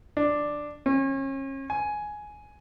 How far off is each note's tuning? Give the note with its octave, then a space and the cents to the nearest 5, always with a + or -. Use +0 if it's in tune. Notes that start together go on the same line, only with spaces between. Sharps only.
D4 +5
C#4 -35
G#5 +10